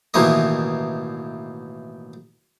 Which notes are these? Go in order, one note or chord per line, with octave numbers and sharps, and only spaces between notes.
A1 B2 D#3 E3 A#3 D#5